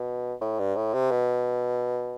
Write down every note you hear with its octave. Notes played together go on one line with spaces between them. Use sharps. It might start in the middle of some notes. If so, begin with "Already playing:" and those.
Already playing: B2
A2
G2
A2
C3
B2